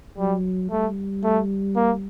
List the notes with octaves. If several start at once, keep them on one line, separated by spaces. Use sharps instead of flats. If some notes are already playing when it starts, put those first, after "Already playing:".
F#3 G3
G3 A3
A3
A#3